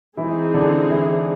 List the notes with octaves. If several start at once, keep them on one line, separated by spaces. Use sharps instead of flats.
E3 G#3 C4 D#4 E4 G#4
D3 D4
E3 E4